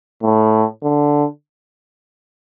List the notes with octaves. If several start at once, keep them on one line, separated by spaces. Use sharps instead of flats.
A2
D3